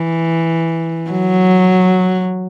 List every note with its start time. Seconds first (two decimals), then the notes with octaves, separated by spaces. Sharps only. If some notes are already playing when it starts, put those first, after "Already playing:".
Already playing: E3
1.10 F#3